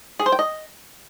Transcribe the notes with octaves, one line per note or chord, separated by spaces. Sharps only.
G#4
C5
G5
D#5